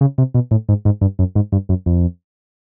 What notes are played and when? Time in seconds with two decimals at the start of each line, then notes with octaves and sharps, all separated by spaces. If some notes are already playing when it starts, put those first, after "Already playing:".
0.01 C#3
0.18 C3
0.34 B2
0.51 A2
0.69 G#2
0.85 G#2
1.01 G2
1.19 F#2
1.35 G#2
1.52 G2
1.69 F#2
1.86 F2